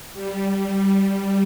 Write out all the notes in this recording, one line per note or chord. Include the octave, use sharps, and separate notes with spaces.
G3